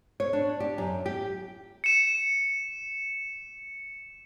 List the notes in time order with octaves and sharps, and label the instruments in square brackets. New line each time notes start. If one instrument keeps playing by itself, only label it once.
[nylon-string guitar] C#5
D4
G4
F#2
G4
[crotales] C#7 E7